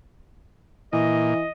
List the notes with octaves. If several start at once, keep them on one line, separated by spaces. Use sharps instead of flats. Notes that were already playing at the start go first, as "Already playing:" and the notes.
A#2 E3 D#5